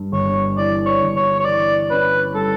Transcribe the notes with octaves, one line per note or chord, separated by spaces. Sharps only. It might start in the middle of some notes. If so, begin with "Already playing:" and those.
Already playing: G2
G1 C#5
E3 D5
C#5
G1
C#5
C#5
E3 D5
C#4 B4
G3 A4